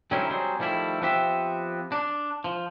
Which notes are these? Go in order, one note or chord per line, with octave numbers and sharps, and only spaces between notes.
D3 F#3 C4 C#4 D#4 E4
F#3 G3 C4 G#4
D#3 F3 G3 A3 E4
F3 B3 C4 G4 E5
D4
F3